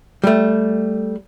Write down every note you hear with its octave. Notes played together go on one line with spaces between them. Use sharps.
G3 A3